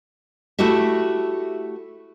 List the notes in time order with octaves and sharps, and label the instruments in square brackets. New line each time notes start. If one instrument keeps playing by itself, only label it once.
[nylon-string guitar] A3 E4 F#4 G4 E5